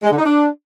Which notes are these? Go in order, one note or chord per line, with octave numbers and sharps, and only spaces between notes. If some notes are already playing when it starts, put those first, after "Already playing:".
G#3
D3
D#4
D4